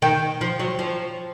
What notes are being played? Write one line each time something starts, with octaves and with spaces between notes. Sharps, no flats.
D#3 G5 G6
F3
F#3
F3